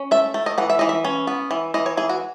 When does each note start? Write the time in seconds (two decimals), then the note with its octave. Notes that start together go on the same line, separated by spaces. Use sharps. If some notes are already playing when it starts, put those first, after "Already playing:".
Already playing: C#4
0.11 A3 E5
0.34 A3
0.46 D#5
0.58 E3 F#5
0.70 E5
0.79 E3 D#5
0.89 E5
1.04 C#4
1.27 B3
1.51 E3
1.74 E3 D#5
1.86 C#5
1.97 E3 G#4
2.09 F#4